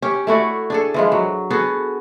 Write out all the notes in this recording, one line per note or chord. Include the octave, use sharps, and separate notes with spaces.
C#4 G4
A3 E4 F#4 D5
D4 G#4 A4
E3 F3 G#3
F#3
B3 F#4 G#4 A4